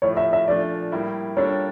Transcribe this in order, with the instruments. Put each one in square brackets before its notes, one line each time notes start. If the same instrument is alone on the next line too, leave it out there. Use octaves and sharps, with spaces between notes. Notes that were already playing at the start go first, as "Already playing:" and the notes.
[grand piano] A2 F3 A3 [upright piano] C#5
[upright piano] E5
E5
[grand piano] A#2 F3 A3 D4 [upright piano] D5
[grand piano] A2 G3 A#3 E4
[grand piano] G3 A#3 D4 F4 A4 [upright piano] C#5